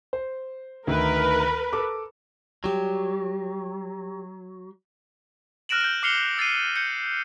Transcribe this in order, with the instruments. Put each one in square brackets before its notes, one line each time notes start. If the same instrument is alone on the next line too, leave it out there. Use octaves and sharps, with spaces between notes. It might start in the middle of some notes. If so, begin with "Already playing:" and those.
[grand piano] C5
[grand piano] D2 D#3 [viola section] A#4 B4
[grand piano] A4 D6
[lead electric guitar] F#3 [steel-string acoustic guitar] G3 G4
[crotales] F6 F#6 A#6 D7 E7 F#7
G6 D7
D6 F6 C7 C#7 F7 G7
E6 A6 C7 D#7
G6 C#7